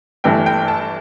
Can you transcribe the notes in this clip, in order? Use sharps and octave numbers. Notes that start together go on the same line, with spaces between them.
G1 G2 E3 A3 G5
G5
A5